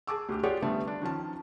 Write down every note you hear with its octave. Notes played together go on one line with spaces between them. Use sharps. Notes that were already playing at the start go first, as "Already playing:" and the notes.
G#4 G#5 A5 D6 E6
D2 G4
F4 G4 G#4 C#5 D5 F#5
D3 G3 A3 B3
D4
D#3 F3 C#4 A5